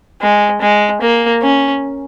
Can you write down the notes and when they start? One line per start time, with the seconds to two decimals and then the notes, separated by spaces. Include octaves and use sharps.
0.22 G#3
0.61 G#3
1.01 A#3
1.42 C#4